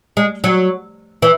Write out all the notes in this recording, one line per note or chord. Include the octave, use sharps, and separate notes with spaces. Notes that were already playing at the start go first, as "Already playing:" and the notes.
G#3
F#3
E3